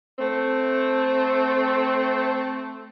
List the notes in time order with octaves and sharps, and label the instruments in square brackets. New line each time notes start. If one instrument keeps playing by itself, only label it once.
[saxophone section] A3 C4